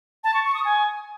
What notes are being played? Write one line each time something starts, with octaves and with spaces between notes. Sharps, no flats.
A5
C#6
C#6
D#6
G#5